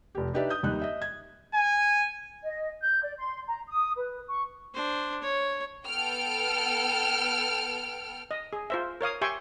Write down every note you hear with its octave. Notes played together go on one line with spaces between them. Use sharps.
F1 G4
D4 D#4 G4 B4 D5 E5
D#6 G6
D#2 G3 D#4 F#6
D#5 E5
G#6
G#5
D#5
G6
D5
C6
A#5
D#6
B4
C#6
D4 C5
C#5
B3 A4 G5 F6 D7
D#5
G#4
F4 C5 E5
A#4 C#5 F5 D#6
G4 E5 G5 G#5 C6 C#6